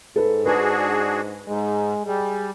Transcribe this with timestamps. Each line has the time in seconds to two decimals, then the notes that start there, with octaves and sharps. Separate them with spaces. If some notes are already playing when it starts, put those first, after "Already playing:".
0.16 G#2 A4 B4
0.46 D4 F#4 G#4 B4
1.47 G#2 G#3
2.06 G3 G#4